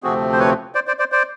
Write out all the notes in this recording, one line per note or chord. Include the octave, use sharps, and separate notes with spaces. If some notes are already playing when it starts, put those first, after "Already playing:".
D2 C3 F3 A3 C4 F#4 G#4
C5
B4 C#5
C5 D5
C5 D5
C5 D5
C5 D5